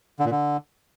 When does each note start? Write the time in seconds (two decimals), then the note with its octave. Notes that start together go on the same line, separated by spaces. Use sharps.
0.20 D3
0.25 A#2
0.31 D3